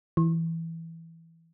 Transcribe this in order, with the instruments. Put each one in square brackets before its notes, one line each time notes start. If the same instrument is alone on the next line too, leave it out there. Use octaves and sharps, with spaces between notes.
[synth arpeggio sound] E3